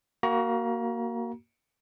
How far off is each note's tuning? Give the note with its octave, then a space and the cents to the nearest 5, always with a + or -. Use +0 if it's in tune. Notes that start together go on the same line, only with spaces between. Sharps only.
A#3 +0 F#4 +20 A#5 +30